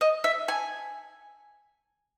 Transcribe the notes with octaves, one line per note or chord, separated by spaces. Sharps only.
D#5
E5
G#5